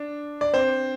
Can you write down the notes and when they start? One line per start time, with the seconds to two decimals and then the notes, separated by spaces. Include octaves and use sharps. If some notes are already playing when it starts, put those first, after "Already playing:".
Already playing: D4
0.41 D5
0.54 C4 C5